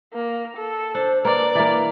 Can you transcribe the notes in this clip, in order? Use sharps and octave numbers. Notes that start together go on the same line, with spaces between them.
A#3
A4
D4 C5
A#3 B4 D5
E3 A#3